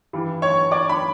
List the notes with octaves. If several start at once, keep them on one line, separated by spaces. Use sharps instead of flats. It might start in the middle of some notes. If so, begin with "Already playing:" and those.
G2 E3 G3
C#5 C#6
D5 D6
B5